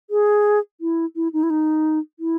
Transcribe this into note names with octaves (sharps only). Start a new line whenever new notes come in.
G#4
E4
E4
D#4
E4
D#4
E4